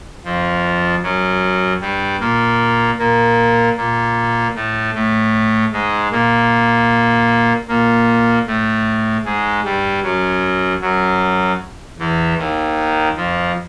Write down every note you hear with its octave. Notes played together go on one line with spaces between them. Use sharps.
F2 F3
F#2 F#3
G2 G3
A#2 A#3
A#2 A#3
A#2 A#3
A2 A3
A2 A3
G#2 G#3
A#2 A#3
A#2 A#3
A2 A3
G#2 G#3
G2 G3
F#2 F#3
F#2 F#3
E2 E3
D#2 D#3
F2 F3